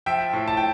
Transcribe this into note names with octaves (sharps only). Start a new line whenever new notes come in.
F3 E5 G5
A2
A5
G5